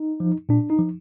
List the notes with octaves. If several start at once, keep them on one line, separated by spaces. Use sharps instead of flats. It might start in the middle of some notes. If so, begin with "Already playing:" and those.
Already playing: D#4
F3
A#2 D4
D#4
F3